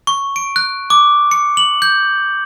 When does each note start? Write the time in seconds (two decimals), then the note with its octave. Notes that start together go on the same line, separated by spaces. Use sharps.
0.07 C#6
0.36 D7
0.56 F#6
0.90 D6
1.31 C#7
1.57 F#7
1.82 G6